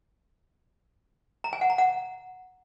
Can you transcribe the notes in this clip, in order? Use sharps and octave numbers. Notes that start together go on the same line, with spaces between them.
A#5
G#5
F#5
A#5
F#5